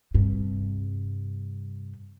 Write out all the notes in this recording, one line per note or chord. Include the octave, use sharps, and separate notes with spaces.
G2 C3